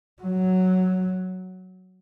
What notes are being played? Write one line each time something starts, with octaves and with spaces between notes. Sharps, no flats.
F#3